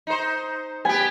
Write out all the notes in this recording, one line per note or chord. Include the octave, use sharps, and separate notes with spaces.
D#4 C5
B3 G4 G#5